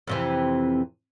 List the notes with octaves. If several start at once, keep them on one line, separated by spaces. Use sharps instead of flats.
F2 C3 E3